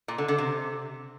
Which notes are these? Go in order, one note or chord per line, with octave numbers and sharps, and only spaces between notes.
A#2
D3
D3
C3